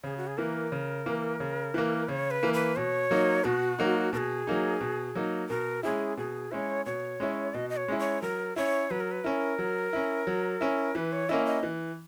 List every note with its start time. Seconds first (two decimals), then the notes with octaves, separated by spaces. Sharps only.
0.04 C#3 G#4
0.17 F#4
0.27 G#4
0.37 E3 A#3 A#4
0.72 C#3
1.06 E3 A#3
1.40 C#3
1.74 E3 A#3
2.08 C#3 C#5
2.31 B4
2.43 E3 A#3
2.54 B4
2.76 B2 C#5
3.11 F#3 A#3 D#4
3.44 B2 F#4
3.78 F#3 A#3 D#4
4.13 B2 A#4
4.17 G#4
4.47 F#3 A#3 D#4
4.81 B2
5.15 F#3 A#3 D#4
5.49 B2 A#4
5.83 G#3 C#4 E4 G#4
6.17 B2 G#4
6.51 G#3 C#4 E4 C#5
6.86 B2 C#5
7.20 G#3 C#4 E4
7.54 B2 D#5
7.70 D#5
7.77 C#5
7.88 G#3 C#4 E4
7.99 C#5
8.22 F#3 A#4
8.56 C#4 E4 C#5
8.91 F#3 B4
9.00 A#4
9.11 B4
9.24 C#4 E4 A#4
9.59 F#3
9.93 C#4 E4
10.27 F#3
10.61 C#4 E4
10.95 E3 B4
11.12 C#5
11.29 A#3 C#4 E4 D#5
11.46 D#5
11.63 E3